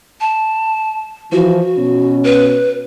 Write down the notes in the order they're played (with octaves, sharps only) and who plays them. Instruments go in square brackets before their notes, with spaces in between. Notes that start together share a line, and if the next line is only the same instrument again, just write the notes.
[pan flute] A5
[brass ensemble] E3 F3 [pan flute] F#4
[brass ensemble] B2 C#4
[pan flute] B4